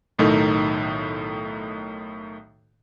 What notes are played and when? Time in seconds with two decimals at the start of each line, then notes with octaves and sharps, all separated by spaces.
0.19 B1 A2 D#3 D#4 A4